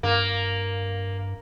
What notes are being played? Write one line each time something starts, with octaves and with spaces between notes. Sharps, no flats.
G2 A#3